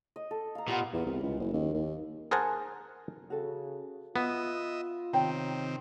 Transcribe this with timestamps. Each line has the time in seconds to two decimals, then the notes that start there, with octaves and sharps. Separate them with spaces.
0.16 D#5
0.31 A4
0.55 F5 A#5
0.68 A#2 B3 F4 G4
0.93 E2
1.06 C2
1.22 C#2
1.39 F#1
1.53 D#2
1.74 D#2
2.31 G#4 A#4 C5 F#5 G#5 A5
3.30 C#3 F#4 A4
4.16 B3 F4 D#5 E5
5.13 C3 D#3 C4 C#5 G5 A#5